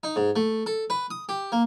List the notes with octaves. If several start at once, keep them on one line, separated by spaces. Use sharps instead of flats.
D#4
G#2
A3
A4
B4
D#6
G4
A#3